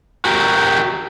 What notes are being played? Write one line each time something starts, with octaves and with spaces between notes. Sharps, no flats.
F#4 G4 A#4